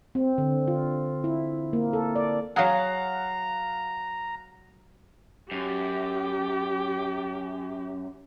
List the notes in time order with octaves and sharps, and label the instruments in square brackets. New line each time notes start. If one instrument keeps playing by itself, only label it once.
[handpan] C4
D3
F4
E4
A#3
A4
D5
[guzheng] F#3 G#4 [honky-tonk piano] F5 F#5 [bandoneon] A#5
[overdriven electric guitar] F#2 [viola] G4